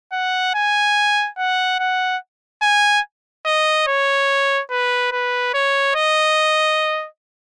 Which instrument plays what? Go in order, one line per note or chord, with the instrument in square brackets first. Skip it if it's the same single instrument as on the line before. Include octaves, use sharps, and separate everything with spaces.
[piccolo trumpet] F#5
G#5
F#5
F#5
G#5
D#5
C#5
B4
B4
C#5
D#5